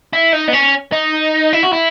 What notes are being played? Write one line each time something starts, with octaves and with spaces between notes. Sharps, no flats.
E4
D#4
B3
C#4
D#4
E4
F#4
E4